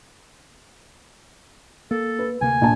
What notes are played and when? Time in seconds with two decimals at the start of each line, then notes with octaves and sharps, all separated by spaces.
1.91 A#3 A4
2.19 B4
2.41 D2 C3 A#3 G#5
2.61 A#1 A5